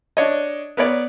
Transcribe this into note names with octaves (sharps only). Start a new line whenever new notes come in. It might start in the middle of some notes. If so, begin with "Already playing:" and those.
D4 C#5 D#5
B3 A#4 C#5 D5